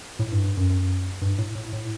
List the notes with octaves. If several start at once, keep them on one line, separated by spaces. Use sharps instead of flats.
A2
G2
G2
F#2
F#2
G2
A2
A2
A2